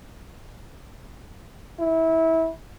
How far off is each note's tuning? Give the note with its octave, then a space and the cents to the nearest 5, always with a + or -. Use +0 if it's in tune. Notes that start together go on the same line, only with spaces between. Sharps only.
E4 -20